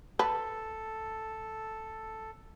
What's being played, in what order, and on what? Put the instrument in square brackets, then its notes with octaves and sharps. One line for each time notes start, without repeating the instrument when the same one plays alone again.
[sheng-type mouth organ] A4 [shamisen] B4 [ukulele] A5